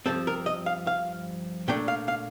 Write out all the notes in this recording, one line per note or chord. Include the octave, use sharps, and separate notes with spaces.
G2 F3 C4 A4
A#4
D#5
F5
F5
A#2 A3 D4 G5
F5
F5